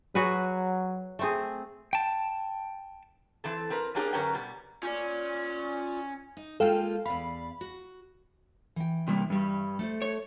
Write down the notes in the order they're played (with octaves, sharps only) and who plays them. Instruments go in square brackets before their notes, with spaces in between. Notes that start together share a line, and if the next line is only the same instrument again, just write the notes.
[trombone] F#3 [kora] F#4 G#4 B4
[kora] A3 C4 G#4
[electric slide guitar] G5 A5
[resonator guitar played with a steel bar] E3 C4 A4
C4 A#4 B4
A#3 C#4 D4 G4 G#4 A#4
F#2 D3 C#4 A#4 B4 G5
B2 G3
[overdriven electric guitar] C#4 [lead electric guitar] F4 D5
[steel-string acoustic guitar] D#4
[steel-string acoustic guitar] G#3 A#3 F4 [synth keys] A4 F5 G5
[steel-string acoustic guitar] E2 D5 F5 [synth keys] B5
[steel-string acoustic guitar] F#4
[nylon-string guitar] E3 G5
[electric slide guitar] C3 G3 A#3
G2 G3
[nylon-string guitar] A3 A4 C5
[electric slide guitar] C#5